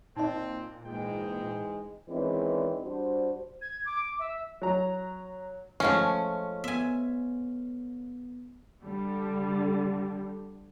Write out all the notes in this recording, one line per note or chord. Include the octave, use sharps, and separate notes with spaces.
A#2 C4 D#4 D#5
G#2 E3 G#3 G5
D#3 E3 G#3 C4 C#4 D5
G3 D4 F#4 C5
G#6
D6
E5
F#3 A#5
F3 G#3 A3 C#4
B3 E5 G#5
D3 G3